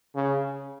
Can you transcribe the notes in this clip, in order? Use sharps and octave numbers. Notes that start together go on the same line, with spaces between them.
C#3